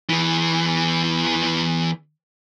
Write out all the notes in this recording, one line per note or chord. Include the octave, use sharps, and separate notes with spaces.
E2 E3